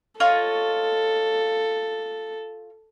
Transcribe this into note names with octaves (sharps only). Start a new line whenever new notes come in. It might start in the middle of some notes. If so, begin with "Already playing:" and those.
F4 A4 C#5 D#5